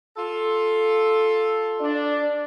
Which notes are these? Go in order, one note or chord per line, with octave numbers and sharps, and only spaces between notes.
F4 A4
D4 D5